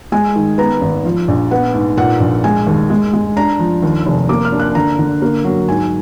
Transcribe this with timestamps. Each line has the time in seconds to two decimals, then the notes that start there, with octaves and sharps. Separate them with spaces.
0.12 G#3 G#5
0.36 D#3
0.58 B3 A#5
0.81 G#1
1.05 F3
1.28 A#1
1.51 B3 F#5
1.74 G#2
1.97 A#2 F#5
2.20 A#1
2.44 G#3 G#5
2.67 D#2
2.90 G#3
3.14 G#3
3.36 D4 A#5
3.59 F3
3.83 D#2
4.06 F1
4.29 A#3 D6
4.45 F6
4.52 D4
4.60 F#6
4.75 D3 A#5
4.99 D3
5.22 A#3
5.44 F#3
5.68 G#2 G#5